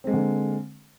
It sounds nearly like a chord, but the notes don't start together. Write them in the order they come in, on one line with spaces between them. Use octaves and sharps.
C4 G#3 A#3 D3